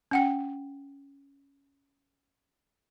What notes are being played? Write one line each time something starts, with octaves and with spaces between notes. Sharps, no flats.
C#4 F#5 G5